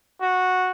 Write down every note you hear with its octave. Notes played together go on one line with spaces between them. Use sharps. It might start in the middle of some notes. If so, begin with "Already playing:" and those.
F#4